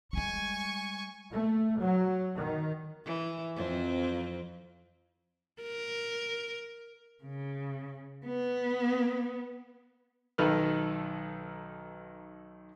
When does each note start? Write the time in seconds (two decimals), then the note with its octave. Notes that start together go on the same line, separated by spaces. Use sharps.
0.13 G3 G#3 G#5 C#6
1.31 A3
1.79 F#3
2.37 D#3
3.05 E3
3.56 F2 C4
5.62 A#4
7.24 C#3
8.26 B3
10.38 B1 D#3 D#4 A4 B4 F6